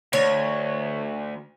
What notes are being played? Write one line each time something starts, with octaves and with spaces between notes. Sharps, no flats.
D2 C#5